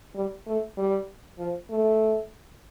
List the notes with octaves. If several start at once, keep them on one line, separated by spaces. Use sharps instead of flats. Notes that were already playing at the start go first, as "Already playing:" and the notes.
G3
A3
G3
F3
A3